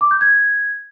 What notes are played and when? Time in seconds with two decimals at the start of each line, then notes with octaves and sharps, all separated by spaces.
0.01 D6
0.11 G6
0.21 G#6